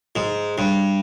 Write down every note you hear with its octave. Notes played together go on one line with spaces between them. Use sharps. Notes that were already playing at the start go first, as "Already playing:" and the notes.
G#2
G2